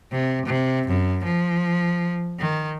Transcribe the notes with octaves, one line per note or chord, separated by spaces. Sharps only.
C3
C3
F#2
F3
D#3